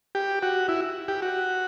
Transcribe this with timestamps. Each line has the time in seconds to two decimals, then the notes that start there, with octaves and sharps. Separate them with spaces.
0.15 G4
0.43 F#4
0.68 E4
1.08 G4
1.22 F#4